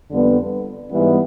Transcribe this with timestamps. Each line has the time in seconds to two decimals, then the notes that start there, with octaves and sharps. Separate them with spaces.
0.11 F2 D3 G3 B3
0.91 G#2 E3 G3 B3